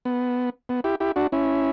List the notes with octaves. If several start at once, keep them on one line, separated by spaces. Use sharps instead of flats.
B3
B3
E4 G4
E4 G4
D4 F#4
C#4 E4